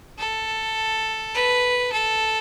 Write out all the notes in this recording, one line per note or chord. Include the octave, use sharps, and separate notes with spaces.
A4
B4
A4